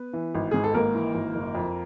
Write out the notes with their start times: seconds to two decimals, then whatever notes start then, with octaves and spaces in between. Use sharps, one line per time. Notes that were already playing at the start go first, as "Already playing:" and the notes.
Already playing: B3 B4
0.13 E3
0.35 G#1
0.51 G#2 G#4
0.64 A4
0.74 G#1 A#3 A#4
0.94 E3
1.15 G#1
1.35 F#1
1.55 F2